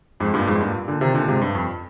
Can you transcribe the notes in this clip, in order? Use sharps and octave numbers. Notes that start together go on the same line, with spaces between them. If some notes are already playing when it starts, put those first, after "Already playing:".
F2 G#2
G2 A#2
F2 G#2
G2 A#2
A#2 D3
C3 D#3
A#2 D3
G#2 C3
G2
F2